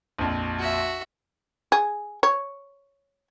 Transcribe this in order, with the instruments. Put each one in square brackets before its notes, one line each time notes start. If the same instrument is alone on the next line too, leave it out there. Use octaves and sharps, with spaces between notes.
[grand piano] A#1 F2
[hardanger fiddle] F#4 E5
[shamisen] G#4
C#5